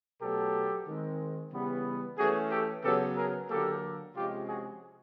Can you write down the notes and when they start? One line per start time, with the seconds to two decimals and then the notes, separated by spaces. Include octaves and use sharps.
0.21 B2 F#3 A3 G4 A4
0.87 D#3 G#3 C4
1.52 C#3 E3 G3 B3
2.18 E3 A3 C#4 F#4 G#4
2.51 G4 A4
2.84 C#3 F#3 B3 G4 A4
3.16 G#4 A#4
3.50 D3 F#3 A#3 G4 A4
4.15 C3 F3 G#3 C#4 F4 G4
4.48 F#4 G#4